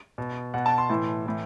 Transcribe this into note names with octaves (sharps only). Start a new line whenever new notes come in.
B2
B2 F#5
A5
C6
A2 E3
A2 E3